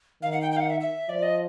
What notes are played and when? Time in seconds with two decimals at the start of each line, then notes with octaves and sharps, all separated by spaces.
0.22 D#3 F5
0.32 F#5
0.41 G5
0.52 G5
0.56 F5
0.60 F#5
0.70 E5
0.80 E5
1.09 F3 D5
1.23 D#5